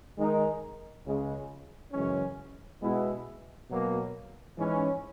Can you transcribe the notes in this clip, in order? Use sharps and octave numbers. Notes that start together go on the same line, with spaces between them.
D#3 G#3 D#4 A#4
C#2 C#3 G#3
F#2 C#3 E3 G#3 C#4
B2 G#3 B3 E4
B2 F#3 A#3
G#2 E3 G#3 C#4